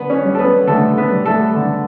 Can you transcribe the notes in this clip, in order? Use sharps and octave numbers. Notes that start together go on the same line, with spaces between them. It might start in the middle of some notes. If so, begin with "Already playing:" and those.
Already playing: D3 B3 B4
C#4 C#5
G3
A4
B3 B4
D3 A3 A4
B3 B4
G3
A3 A4
D3